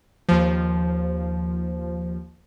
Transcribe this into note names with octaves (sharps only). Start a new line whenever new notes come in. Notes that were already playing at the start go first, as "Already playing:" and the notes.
D#2 F3